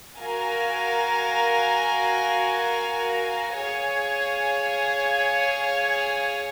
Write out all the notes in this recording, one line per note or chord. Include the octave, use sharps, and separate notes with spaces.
F#4 A#4 F5 G#5
G#4 C#5 F5 G#5